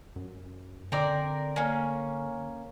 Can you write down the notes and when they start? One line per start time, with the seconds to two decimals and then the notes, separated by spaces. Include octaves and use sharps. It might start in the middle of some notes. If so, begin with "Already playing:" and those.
0.16 F#2
0.92 D3 C4 A#4 D5
1.56 A#3 C#4